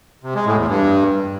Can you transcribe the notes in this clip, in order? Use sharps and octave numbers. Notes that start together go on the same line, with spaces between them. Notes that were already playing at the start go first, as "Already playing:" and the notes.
C3
G#3
A2
E2
G2